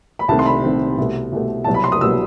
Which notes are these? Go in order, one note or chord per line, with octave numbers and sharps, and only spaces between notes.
B5
C2 C3 D#3 A3 C4 A5
C6
B5
C2 C3 D#3 A3 C4
C2 B2 A3
C2 B2 A3
C2 B2 F#3 A5
B5
C6
D#6
C2 B2 F#3 E6